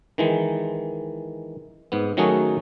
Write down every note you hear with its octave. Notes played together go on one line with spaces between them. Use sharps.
D#3 E3 G#3
G#2 B3
D#3 F#3 A3 C#4 F#4 G#4